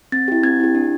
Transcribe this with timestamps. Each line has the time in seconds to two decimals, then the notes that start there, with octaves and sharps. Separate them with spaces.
0.12 C4 A6
0.28 E4 G4
0.43 C4 G#6
0.60 E4 G4
0.75 D4